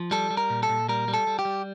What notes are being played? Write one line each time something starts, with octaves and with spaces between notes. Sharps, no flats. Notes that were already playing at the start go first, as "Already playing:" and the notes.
Already playing: F3
G3 A4
G3
A#4
A#2
A4
A#2
G3 A#4
G3
A4
G3
G4
G3